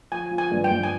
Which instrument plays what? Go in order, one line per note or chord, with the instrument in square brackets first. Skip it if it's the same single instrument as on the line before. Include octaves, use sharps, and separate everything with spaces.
[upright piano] F3 [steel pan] G#5
[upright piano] F3
[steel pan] G#5
[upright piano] G2
[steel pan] G5
[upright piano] G2
[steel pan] G#5